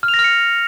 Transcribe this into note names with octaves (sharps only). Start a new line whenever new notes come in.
F6
F7
A#6
F6
C#7